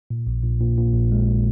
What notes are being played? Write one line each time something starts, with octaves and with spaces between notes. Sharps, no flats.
A#2
A#1
A#2
A#2
A#2
A#1
G#3